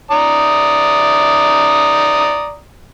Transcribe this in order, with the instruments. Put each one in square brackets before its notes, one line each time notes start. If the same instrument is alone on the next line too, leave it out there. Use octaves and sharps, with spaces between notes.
[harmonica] D5 A#5 D#6